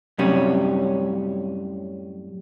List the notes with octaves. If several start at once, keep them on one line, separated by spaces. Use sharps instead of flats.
F#2 A2 C3 G3 C#4